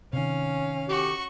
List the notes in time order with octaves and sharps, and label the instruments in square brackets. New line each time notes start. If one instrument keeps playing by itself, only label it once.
[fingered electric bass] C3 D#3 [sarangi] C#4 [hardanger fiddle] F5
[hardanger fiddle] F#4 C#6 [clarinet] G4